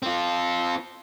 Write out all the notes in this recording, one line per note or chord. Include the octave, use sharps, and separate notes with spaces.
C4 F4